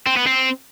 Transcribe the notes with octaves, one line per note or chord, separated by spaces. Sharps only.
C4
B3
C4